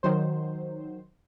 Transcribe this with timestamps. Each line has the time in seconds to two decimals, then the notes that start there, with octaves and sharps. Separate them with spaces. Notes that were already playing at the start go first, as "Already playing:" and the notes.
0.03 D#3 F#3 C5